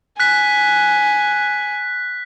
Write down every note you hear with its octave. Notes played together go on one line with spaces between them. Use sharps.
G#5 F#6 B6